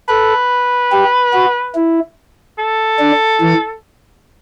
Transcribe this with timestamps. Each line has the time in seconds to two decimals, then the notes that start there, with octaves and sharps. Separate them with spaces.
0.09 A4 B4
0.92 G4
1.33 F#4
1.75 E4
2.58 A4
3.00 D4
3.41 E3